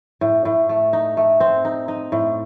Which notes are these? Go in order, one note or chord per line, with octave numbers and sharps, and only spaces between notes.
A2
A2
A3
D#4
A3
C4
D#4
D#4
A2